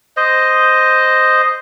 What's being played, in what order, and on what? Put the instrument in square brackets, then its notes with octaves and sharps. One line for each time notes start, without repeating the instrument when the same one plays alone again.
[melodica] C5 D#5